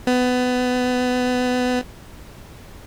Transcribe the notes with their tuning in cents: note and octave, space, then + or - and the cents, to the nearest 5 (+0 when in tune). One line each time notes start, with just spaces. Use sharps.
B3 +20